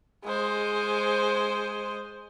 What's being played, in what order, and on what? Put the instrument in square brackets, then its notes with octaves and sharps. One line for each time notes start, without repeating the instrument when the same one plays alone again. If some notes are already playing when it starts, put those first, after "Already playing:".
[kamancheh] G#3 C5